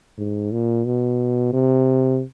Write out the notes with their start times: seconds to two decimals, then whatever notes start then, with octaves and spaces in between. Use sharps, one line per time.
0.18 G#2
0.52 A#2
0.86 B2
1.53 C3